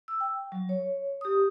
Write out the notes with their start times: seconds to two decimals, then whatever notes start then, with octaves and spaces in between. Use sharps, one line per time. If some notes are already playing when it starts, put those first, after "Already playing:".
0.08 E6
0.21 G5
0.52 F#3
0.69 C#5
1.21 G4 D#6